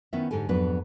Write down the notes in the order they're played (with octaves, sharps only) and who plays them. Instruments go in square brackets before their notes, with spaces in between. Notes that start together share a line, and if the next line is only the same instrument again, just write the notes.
[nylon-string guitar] D#3 B3 C#4 E4 C5 E5
G#2 D3 G4 A4 G#5
F2 G#2 F#3 B3 D4 B4